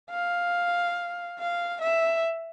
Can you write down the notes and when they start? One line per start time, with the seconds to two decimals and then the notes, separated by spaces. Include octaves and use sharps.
0.11 F5
1.39 F5
1.82 E5